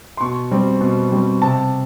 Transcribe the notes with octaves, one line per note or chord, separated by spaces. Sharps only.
C6
B2 C#6
G3 C4
B2
G3 C4
C3 A5